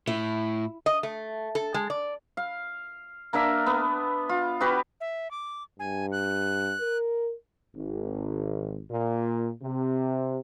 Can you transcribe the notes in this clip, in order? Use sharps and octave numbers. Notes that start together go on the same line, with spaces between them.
A2 E4
D#5
A3
A4
G#3
D5
F5
A#3 D4 A#4 E5
B3
F4
B3 F#4 G4 B4
E5
D6
G2 G#5
F#6
A#4
G#1
A#2
C3